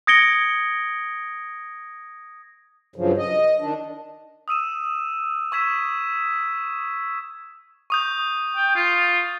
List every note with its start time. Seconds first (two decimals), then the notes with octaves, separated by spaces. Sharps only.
0.07 D#6 G#6 A#6 C#7 D7 G7
2.96 G2 C#3 F3 F#3
3.18 D#5
3.59 D#3 D4
4.48 D#6 E6 D#7 E7
5.52 C#6 E6 G#6 B6 E7
7.90 C#6 D#6 G6
8.56 G5
8.75 F4